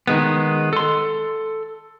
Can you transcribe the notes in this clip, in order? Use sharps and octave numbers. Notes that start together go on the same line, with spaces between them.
D#3 G#3 B3
A4 C6